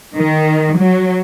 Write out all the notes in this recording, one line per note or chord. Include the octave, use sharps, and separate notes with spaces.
D#3
F#3